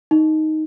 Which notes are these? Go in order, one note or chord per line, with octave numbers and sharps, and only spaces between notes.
D#4